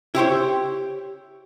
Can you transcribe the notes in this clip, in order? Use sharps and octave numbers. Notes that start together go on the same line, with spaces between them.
E4 G4 C5 C#5